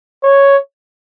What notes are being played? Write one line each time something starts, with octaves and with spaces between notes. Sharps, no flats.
C#5